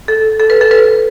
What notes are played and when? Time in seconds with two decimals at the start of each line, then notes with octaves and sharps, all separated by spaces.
0.08 A4
0.40 A4
0.50 B4
0.61 A4
0.71 B4